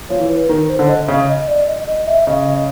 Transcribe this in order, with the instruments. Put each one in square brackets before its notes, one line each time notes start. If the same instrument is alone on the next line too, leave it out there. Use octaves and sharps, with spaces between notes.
[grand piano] F3 [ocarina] C#5
[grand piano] E3
[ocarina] B4
[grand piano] D#3 [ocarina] A#4
[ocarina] C5
[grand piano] D3
[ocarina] D#5
[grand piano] C#3
[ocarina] D#5
D5
D#5
D#5
E5
[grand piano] C#3 [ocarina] D#5